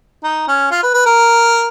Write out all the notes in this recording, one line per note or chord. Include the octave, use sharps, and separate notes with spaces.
D#4
C#4
F4
B4
B4
A#4